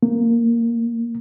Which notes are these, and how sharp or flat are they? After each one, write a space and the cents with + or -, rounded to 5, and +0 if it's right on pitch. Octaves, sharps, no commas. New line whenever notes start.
A#3 -5